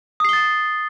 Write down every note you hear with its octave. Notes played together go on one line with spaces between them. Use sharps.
D#6 A6 C7 G7